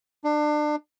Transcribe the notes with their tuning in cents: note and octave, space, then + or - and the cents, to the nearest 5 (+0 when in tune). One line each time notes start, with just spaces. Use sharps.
D4 +30